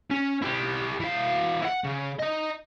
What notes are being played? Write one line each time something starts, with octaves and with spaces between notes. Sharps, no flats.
C#4
E4 G4
E3 F5
E4 F#5
C#3
D#4 D#5